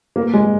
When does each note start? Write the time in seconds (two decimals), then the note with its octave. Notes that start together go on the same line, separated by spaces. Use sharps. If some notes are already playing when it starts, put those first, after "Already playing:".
0.16 A#3
0.34 G#3